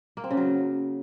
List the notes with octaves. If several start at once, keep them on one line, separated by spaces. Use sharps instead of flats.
A#3
C4
C#3
F#3